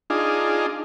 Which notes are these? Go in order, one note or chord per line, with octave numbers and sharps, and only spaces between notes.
D4 D#4 F4 G#4